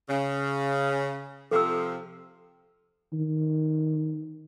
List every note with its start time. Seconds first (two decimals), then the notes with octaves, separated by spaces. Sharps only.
0.08 C#3
1.51 C3 F3 A4 E6
3.13 D#3